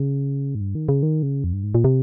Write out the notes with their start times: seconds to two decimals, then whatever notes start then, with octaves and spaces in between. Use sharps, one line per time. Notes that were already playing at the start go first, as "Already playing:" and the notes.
Already playing: C#3
0.55 G#2
0.61 G2
0.75 D#3
0.89 C#3
1.03 D#3
1.23 C#3
1.44 F2
1.53 G2
1.64 G#2
1.75 A#2
1.84 C3